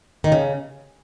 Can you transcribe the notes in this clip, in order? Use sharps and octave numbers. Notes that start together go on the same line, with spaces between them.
D#3
C#3